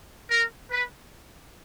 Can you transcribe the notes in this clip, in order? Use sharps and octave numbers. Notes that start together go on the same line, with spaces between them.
A#4
B4